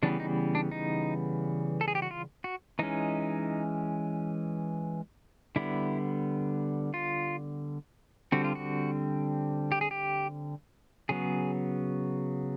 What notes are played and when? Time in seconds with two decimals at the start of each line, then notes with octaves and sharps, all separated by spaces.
0.03 C#3 E3 G3 B3 D4
0.20 D#4
0.55 D4
0.71 D#4
1.81 A4
1.88 G#4
1.95 G4
2.02 F#4
2.11 F4
2.44 F#4
2.79 E3 G#3 C#4 D#4
5.56 D3 G3 B3 E4
6.94 F4
8.32 D3 G3 C4 F#4
8.44 F4
8.55 F#4
9.72 G4
9.81 G#4
9.91 G4
11.09 C#3 F#3 B3 G#4